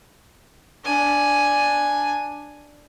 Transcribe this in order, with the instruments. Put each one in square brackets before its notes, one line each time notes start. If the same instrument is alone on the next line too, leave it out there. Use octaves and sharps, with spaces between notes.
[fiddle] D4 G#5